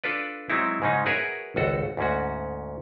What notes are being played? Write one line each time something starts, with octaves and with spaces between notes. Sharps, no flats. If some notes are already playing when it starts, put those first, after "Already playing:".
D4 F4 A4 B4 D5
F#3 G#3 C4 D#4 E4
G#2 C#3 G#3 C#4 D#4
F#4 G#4 A#4 B4 C#5 E5
G#1 C#2 F#4 A4
D2 G#2 C#4 F#4